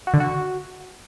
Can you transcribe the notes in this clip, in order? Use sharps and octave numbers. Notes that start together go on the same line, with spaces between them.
F#4
D3
F#4